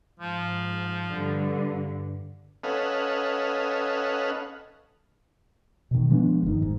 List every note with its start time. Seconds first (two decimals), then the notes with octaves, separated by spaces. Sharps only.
0.20 G#2 F3
1.10 G2 D3
2.63 C#4 A4 B4 D#5 F5 F#5
5.91 B2 D#3
6.10 F3 G#3 B3 D4
6.43 G1 D#3
6.62 G#2